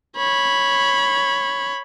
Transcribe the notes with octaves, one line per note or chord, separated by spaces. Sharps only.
C#5 B5